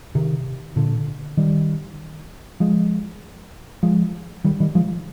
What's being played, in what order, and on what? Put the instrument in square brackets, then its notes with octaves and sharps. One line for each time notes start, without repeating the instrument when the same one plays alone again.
[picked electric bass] C3 D#3
A#2 D3
D#3 G3
F3 G#3
F3 G#3
D#3 G3
D#3 G3
F3 G#3